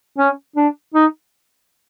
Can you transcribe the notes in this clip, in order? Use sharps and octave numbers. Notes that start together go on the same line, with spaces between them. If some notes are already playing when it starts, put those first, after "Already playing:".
C#4
D4
D#4